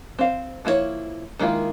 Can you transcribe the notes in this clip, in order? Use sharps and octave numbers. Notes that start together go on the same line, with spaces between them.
C4 F5
F3 A#3 E4 F#4 C#5
D#3 G#3 A#3 E4 F4